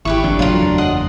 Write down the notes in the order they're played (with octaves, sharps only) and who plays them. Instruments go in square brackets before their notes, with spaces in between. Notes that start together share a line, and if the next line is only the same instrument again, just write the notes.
[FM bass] G#1 [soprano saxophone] E4 [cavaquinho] G4 B4 C#6
[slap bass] F1 A#1 A2 [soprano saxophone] D4
[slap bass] F#1 E2 A3 [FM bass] F#3 [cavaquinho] F4 A#4
[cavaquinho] D#5 F#5 C6